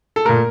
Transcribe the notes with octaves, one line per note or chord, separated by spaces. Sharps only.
A4
A#2 A3 A#4